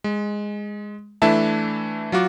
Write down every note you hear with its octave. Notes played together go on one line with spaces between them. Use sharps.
G#3
E3 A3 D4 E4 E5 A5
F#3 F4 F#4 D6